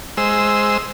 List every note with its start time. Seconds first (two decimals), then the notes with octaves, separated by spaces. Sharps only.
0.17 G#3 C5 E6